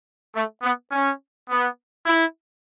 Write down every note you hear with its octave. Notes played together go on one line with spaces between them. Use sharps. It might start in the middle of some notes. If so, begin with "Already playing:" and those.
A3
B3
C#4
B3
E4